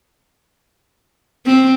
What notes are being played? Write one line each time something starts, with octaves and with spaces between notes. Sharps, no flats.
C4